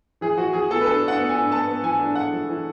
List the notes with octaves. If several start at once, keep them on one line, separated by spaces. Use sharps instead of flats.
E3 G#4
E3 F#4
E3 G#4
B3 A4
B4
D4 A4
D4 F#5
B3
G#5
D4
B3 A5
B3
E3 G#5
D4
D4 F#5
E3
E3